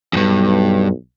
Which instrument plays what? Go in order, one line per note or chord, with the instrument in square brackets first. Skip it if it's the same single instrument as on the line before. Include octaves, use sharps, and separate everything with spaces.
[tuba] B1 [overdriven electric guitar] E2 G2